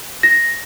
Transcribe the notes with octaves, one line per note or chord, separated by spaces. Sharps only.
A#6